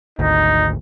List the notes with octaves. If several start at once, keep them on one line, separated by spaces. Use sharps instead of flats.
G#1 D2 D#4